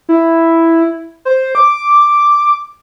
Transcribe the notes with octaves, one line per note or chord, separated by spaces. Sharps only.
E4
C5
D6